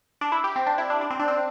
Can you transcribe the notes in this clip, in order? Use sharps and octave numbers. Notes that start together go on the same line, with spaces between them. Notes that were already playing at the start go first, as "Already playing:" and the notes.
D4
E4
G4
C4
D4
E4
D4
D4
C4
D4
C4